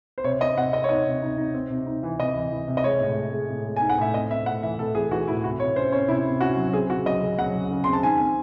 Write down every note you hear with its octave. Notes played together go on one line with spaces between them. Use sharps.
C5
C3 C#5
C4 D#5
C3 F#5
C4 D#5
C#5
D#4 D#5
C3
D#4
D#4
C4
C3
D#4
E3
C3 D#5
E3
E3
C3
D#5
G#3 C#5
A2
G#3
G#3
A2
G#3
D#4 G#5
F#5
A2 E5
C4 D#5
C4 E5
A2 F#5
E3 E5
A2 A4
E3 G#4
E3 F#4
A2 E4
C3 F#4
C3 C#5
C#4 C5
C#4 C#5
C3 E4
C3
C#4 F#4
F#3
C4 G#4
C#3 F#4
F#3 D#5
C#3
F#3 F#5
C#3
C#3
C4 C6
A5
D#3 G#5
C4